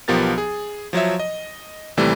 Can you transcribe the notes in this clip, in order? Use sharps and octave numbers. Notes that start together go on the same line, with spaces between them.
B1 F3 B3 G4 A#4 A6
G#4
F3 F#3 C#5 E5
D#5
D#2 C3 E3 G3 A3